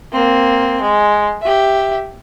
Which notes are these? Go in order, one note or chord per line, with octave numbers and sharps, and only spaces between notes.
A#3 C4
G#3
G4 E5